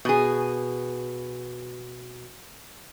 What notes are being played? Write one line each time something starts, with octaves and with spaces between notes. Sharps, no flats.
B2 G#4